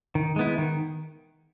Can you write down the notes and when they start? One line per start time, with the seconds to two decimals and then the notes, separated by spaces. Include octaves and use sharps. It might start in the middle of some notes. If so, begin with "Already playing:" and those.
0.15 D#3
0.36 G#3 B3 E4
0.58 D#3